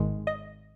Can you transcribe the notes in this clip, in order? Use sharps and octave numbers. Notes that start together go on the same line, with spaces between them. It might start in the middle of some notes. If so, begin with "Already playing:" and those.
Already playing: G#1 G#2 D#3 G#3
D#5